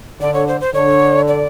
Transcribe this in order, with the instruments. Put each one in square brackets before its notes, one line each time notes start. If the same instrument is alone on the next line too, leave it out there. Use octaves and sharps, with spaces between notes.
[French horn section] D3 [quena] D5
[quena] C#5
C5
C5
[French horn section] D3 [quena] C#5
[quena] D5